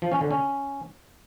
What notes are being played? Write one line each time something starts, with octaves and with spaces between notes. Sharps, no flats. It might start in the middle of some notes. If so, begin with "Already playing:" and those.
F3
C#4
D3
C#4